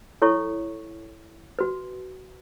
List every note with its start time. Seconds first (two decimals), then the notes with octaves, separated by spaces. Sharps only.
0.22 E4 A4 C#5 C#6
1.59 F#4 B4